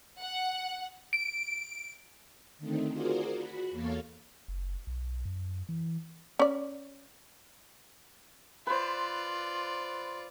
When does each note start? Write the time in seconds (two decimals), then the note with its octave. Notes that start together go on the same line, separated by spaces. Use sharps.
0.20 F#5
1.13 D7
2.58 D3 D#3 A3 C4 D#4
2.91 F4 F#4 G#4 A#4 C5 D5
3.34 F#4 B5
3.71 E2 A#3 A4 C#5 F5 A6
4.48 F#1
4.87 B1
5.25 F#2
5.69 E3
6.39 C#4 D5
8.67 F4 B4 C5 D5 C6